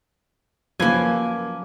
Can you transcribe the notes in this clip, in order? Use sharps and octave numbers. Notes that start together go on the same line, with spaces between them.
F#2 F3 A#3 B4 G#5